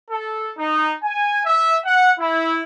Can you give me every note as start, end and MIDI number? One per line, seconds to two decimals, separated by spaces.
0.10 0.49 69
0.57 0.93 63
1.04 1.42 80
1.46 1.79 76
1.85 2.12 78
2.20 2.62 64